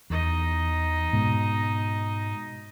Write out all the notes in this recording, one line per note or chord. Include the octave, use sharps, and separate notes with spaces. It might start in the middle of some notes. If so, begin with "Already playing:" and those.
E2 D#4 D#5
G#2 B2